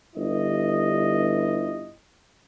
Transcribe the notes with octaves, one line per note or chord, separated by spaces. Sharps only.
G1 E4 D#5